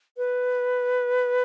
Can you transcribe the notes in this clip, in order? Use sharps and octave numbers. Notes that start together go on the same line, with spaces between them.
B4